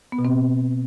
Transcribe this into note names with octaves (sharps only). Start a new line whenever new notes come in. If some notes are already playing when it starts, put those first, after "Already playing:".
B3
B2
C4